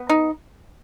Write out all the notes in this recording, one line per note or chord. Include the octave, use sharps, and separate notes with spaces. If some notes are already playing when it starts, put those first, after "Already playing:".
Already playing: B3
D#4